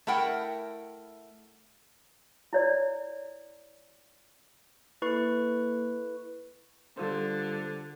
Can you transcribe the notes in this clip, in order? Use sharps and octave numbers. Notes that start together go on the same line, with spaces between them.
A3 E4 A#4 F#5 G5
E4 C#5 D5
A#3 E4 A4 B4 C#6
D3 G3 F4 C5